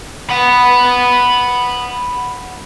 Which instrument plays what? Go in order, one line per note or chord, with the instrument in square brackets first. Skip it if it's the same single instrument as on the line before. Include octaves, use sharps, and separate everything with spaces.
[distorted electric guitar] F#5 B5